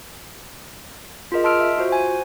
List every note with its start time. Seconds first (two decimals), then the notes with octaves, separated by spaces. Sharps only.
1.32 F4 G#4 A#4 D#5
1.44 D#5 A5 C6 E6 F6 D7
1.61 E5
1.78 F4 F#4 C5
1.89 C5 G#5
2.01 F#5